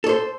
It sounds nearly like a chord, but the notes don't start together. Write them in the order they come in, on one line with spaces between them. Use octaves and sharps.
A4 C#5 C5